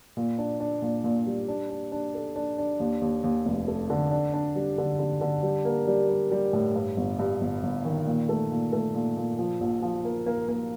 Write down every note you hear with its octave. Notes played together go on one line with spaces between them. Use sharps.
A#2
D4
D4
A#2
A#2
G3
D4
D4
D4
A4
D4
D4
D#2
D#2
D#2
F1
A3
D3
D4
D4
G3
D3
D3
D3
G3
A#3
G3
G3
G3
A2
G2
G1
G2
G1
G1
D#3
A#2
A3
A#2
A3
A#2
A#2
F3
A#1
F3
A#3
A#3
A#3